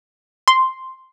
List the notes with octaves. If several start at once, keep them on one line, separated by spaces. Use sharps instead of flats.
C6